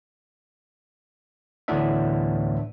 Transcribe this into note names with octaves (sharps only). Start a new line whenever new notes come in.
D2 A2 E3 B3 D4 E5